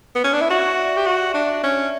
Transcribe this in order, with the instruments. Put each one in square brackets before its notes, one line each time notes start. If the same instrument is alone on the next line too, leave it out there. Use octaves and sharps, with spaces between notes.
[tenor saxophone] B3
C#4
D4
E4
[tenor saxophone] F#4 [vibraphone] E5
[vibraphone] D5
[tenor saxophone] G4 [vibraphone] E5
[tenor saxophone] F#4 [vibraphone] D5
[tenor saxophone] D4
C#4